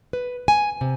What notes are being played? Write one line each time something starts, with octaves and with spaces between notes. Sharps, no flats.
B4
G#5
C3